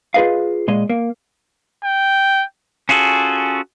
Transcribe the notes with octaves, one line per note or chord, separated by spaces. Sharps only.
F4 G#4 B4 D#5 F5
A#2 G#3 D#5
A#3
G5
C#4 F4 F#4 G#4 A4